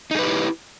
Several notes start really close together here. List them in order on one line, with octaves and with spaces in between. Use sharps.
D#4 G#4 B4 G4 E4